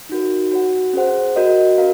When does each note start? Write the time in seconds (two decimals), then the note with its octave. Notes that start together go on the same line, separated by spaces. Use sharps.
0.09 D#4 F#4 A#4
0.52 F#4 C#5 F#5
0.93 C#4 G#4 C5 F#5
1.36 C#4 F#4 A#4 D#5 F#5
1.78 F#4 A#4 F5